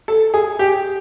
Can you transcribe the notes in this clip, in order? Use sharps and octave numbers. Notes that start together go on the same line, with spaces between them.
A4
G#4
G4